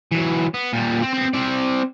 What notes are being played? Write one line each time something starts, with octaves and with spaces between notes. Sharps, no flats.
E3 F#3
B3
A#2 G3
C4
B3 C4
C4 D5